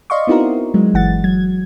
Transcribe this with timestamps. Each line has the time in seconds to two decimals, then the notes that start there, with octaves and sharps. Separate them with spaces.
0.10 D5 D#5 F5 C6 C#6
0.27 B3 C4 D#4 E4 F#4 A#4
0.74 F#3 G#3
0.94 G1 E3 F#5 A6
1.24 F#3 G#6